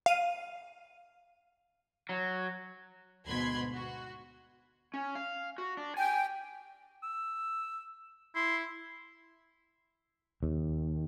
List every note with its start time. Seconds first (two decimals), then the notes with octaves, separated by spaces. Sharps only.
0.06 F5 D#7
2.09 F#3
3.27 D2 G#2 B2 B5 C6 G#6
3.73 F#4
4.94 C#4
5.15 F5
5.58 F#4
5.77 D4
5.97 G5 G#5
7.03 E6
8.35 E4 C6
10.43 D#2